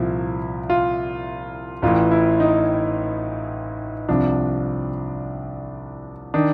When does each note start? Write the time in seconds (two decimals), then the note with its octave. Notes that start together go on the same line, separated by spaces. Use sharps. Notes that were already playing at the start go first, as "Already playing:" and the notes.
Already playing: C2 A#2 F3 E4
0.70 F4
1.82 A1 A2 E3 F4
2.11 E4
2.40 D#4
4.08 C2 C3 F3 D4
6.34 D#3 D4